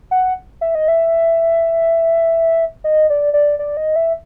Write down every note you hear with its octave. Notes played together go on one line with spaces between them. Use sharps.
F#5
E5
D#5
E5
D#5
D5
D5
D5
D#5
E5